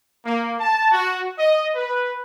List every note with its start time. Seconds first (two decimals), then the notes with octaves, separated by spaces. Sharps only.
0.24 A#3
0.59 A5
0.91 F#4
1.38 D#5
1.74 B4